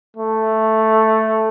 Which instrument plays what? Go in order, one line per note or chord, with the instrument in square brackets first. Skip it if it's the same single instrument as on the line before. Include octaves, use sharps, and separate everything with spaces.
[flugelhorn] A3